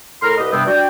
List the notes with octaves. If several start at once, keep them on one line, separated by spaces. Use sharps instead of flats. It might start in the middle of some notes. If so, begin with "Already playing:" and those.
A2 A#4 A#5 C6 F6
C2 G4 B4 D#5
G2 C3 G3 B3 C4
D4 F#4 D5 G5